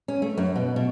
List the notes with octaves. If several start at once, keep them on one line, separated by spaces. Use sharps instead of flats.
C#4
A3
F#2
B2
B2